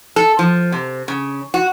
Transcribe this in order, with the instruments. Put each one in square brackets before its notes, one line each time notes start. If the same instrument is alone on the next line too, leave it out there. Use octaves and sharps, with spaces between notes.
[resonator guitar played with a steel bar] A4
F3
C3
C#3
F#4